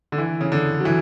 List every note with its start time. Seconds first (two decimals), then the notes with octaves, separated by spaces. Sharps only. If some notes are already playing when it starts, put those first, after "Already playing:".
0.12 D3
0.18 E3
0.41 C#3
0.52 D3
0.81 F#3
0.85 E3